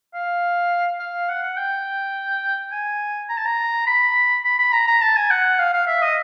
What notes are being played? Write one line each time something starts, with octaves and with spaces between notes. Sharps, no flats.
F5
F5
F#5
F#5
G5
G#5
A#5
A5
A#5
B5
B5
B5
A#5
A#5
A5
G#5
F#5
F5
F5
E5
D#5